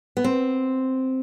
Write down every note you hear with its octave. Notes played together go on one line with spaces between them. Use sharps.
B3
C4